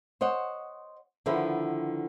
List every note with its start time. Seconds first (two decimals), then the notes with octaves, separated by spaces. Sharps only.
0.21 C5 C#5 D#5 F#5
1.26 D3 D#3 F3 B3 E4